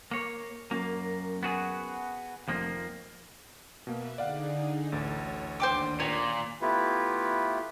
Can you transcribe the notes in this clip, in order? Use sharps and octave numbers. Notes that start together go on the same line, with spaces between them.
A#3 C#5
F#2 A#3
B3 F#4 G#4
F1 F2 F3 A#3
B2 A#3 B4 E5
D3 D#4 G#4 D5 F5 F#5
A1 D2 C#5 A6
D#2 D4 C5 G5 D6 D#6
A#2 C#5
A3 B3 E4 F4 G4 B4